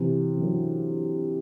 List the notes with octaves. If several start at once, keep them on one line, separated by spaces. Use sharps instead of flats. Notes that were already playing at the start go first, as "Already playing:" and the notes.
Already playing: C3 E3
E3
D3 F#3